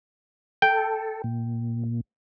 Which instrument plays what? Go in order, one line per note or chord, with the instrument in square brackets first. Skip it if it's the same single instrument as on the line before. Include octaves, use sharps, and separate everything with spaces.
[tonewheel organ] A4 [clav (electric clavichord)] G5
[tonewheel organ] A#2